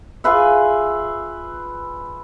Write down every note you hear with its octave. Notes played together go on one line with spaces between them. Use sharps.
F4 G#4 B4 E5